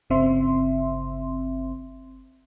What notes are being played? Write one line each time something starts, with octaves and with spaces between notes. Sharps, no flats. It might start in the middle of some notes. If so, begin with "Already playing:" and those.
G1 C#3 C4 E5 C6